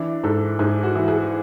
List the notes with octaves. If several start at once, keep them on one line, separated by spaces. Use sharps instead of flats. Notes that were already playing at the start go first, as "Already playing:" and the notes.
Already playing: E3 D4
G#2 A4
G#2 G#4
F#4
E3
G#4